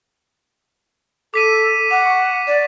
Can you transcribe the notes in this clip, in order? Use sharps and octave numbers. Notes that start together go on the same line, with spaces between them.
A4 D6 B6 D#7
F#5 D6
C#6
D5